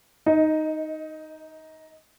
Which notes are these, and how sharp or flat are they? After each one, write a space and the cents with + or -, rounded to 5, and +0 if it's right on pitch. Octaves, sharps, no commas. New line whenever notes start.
D#4 +0 D#5 +25